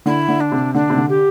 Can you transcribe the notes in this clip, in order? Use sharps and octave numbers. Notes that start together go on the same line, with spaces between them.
D3 E4
D3
D4
C3
D3 D4
C3
D3
G4